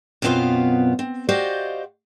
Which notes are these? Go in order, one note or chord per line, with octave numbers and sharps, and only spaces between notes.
F#2 B2 B3 C4 F4 F5
C4
F#4 G4 C5 D5 D#5 F5